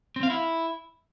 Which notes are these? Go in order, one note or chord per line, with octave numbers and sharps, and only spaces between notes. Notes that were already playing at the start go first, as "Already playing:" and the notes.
C4
F5
E4